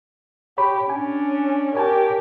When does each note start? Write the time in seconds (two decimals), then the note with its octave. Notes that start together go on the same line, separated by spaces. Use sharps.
0.58 G4 C#5 B5
0.90 C#4 D4 G#5
1.75 G4 A#4 C#5 G#5 A5